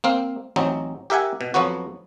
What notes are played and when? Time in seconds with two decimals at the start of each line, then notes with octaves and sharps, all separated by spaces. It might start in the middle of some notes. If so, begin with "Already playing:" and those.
0.04 A#3 C4 F5
0.56 A1 F#3 C4 D#4
1.10 G4 A#4 E5 F#5 G#5
1.41 B2
1.54 F2 F3 F#3 B3 F#4